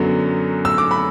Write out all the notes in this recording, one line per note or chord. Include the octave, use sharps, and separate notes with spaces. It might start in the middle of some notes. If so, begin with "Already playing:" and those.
Already playing: F#2 D3 F#3 B3
E6
D6
B5